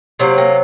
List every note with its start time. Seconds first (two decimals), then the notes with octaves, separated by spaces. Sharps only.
0.19 C3 F#3 A#3 C4
0.38 A#3